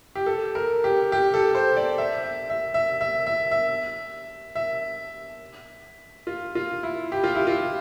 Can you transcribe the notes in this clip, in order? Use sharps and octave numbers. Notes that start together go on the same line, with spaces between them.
G4
A4
A#4
G4
G4
A4
C5
D5
E5
E5
E5
E5
E5
E5
E5
E5
F4
F4
E4
G4
F4
E4
F4